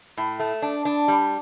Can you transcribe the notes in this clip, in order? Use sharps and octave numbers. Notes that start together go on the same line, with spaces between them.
A2
A3
D4
D4
G3